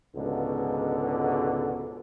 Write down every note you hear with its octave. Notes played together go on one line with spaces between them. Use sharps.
C#2 G#2 B2 D3